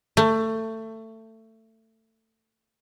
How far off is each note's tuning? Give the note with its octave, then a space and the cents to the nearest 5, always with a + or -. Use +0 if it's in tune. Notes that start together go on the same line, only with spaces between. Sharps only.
A3 +20